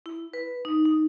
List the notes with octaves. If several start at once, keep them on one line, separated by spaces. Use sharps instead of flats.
E4
B4
D#4
D#4